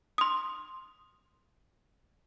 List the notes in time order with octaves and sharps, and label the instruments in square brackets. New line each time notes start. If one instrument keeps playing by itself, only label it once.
[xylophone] C6 D#6